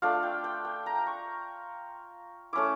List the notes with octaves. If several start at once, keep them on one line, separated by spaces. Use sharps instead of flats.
A3 D4 F4 F5
G5
G5
G5
A#5
C#6
A3 C#4 E4 D6